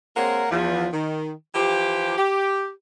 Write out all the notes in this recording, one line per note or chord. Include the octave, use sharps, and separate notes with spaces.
G#3 A#3 C4 A#4 C#5 F#5
E2 F3
D#3
E3 F3 F4 G4
G4